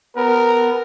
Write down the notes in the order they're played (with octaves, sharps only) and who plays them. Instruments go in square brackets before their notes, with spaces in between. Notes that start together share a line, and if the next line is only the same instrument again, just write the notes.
[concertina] B3 [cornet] A#4